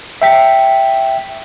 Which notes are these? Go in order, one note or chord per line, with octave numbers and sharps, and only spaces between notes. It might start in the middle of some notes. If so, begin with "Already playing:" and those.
E5 G5 B6